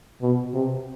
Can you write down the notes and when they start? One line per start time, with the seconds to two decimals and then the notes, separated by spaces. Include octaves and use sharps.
0.21 B2
0.53 C3